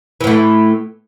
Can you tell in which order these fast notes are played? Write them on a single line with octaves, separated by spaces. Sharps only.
E3 A2 A3